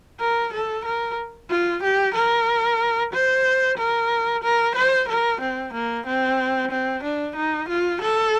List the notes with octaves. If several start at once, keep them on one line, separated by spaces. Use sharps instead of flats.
A#4
A4
A#4
F4
G4
A#4
C5
A#4
A#4
C5
A#4
C4
A#3
C4
C4
D4
D#4
F4
A4